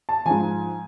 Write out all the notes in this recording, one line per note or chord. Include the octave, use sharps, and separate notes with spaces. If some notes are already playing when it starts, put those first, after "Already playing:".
A5
G#2 F3 G#5